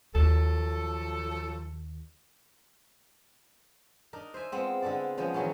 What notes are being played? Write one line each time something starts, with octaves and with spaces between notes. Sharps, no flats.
D#2 F3 F#3 A4
D4 D#4 A#4
C5 E5 G#5
G#3 B3 C4 F4
D3 G#3 D4 A4 D5
C#3 F3 G#3 B3
D#3 E3 F#3 A3 C#4 D4